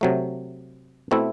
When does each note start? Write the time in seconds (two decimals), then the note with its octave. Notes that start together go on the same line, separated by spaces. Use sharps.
0.01 C3 F#3 A3
1.11 B2 A3 C4 E4